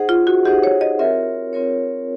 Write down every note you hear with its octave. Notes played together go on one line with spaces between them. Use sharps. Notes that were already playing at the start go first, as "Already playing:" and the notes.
Already playing: D#4 G#4 C5 D#5 F#5
F4
F#4
D#4 G4 G#4 C5 D#5 F#5
C#5
D#5
C4 F4 A#4 C#5 E5
C4 F4 A#4 C#5